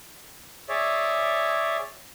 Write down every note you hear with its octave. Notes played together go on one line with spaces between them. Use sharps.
G#4 C#5 D5 E5